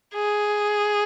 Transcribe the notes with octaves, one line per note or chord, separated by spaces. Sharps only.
G#4